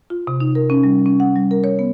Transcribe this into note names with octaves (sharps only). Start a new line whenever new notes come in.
F4
C3
D#4
A#4
C#4
G3
C#4
F#5
G3
A#4
C#5
B3